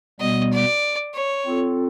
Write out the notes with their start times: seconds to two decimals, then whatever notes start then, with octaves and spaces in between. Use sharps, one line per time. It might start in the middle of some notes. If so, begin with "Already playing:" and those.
0.20 B2 G3 B3 D#5
0.53 D5
1.14 C#5
1.46 C4 F4 A4